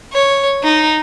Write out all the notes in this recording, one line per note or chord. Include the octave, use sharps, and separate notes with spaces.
C#5
D#4